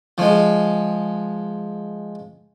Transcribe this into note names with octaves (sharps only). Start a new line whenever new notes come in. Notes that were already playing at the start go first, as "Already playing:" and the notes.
F3 G#3